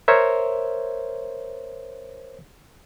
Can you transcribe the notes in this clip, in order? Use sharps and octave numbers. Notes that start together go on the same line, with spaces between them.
A#4 C5 C#5 E5